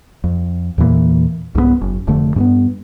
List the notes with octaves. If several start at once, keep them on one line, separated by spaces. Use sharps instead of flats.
F2
E2 A#2 E3 A#3
C2 G#2 G#3 B3
F#1
F1 F2 D3 A3
G2 A#3 B3